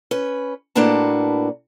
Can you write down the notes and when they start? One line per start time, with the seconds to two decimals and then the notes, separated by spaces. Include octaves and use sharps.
0.11 C#4 B4
0.75 A2 A#3 D4 F#4 B4 A5